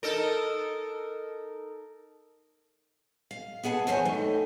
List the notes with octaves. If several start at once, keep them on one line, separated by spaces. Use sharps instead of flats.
D#4 A4 A#4
F5
B3 G#4 F#5 G#5 A5
E2 F#4 C5 C#5 F#5 G#5
A2 A3 D#4